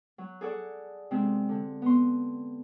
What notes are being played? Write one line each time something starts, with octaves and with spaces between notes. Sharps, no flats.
F#3
G#4 A4 D5 F#5
C3 G#3 C4 D4
D3
B3 C6